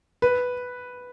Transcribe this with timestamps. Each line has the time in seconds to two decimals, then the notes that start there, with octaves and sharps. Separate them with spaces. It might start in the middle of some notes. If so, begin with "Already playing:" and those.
0.22 B4